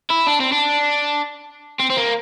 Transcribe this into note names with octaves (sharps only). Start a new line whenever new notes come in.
E4
D4
C4
D4
C4
C4
A#3